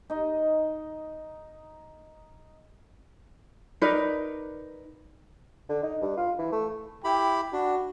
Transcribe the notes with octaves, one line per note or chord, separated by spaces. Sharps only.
D#4 D#5
D#4 A#4 B4 D5
D3
D#4
G2
F4
E3
A3
E4 G4 G5 B5
D4 F#4